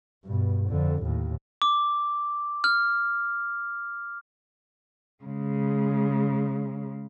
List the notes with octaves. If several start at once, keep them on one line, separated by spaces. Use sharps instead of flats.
G2 B2
F2 D3
D#2 A2
D6
F6
C#3 G#3